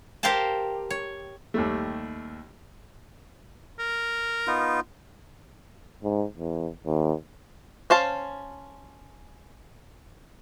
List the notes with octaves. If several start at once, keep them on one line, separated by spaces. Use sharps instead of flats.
G4 A#4 C5 F5 G5 A5
C#5
D#2 G3 A3
A#4
B3 D#4 F4
G#2
E2
D#2
C#4 C5 F5 A5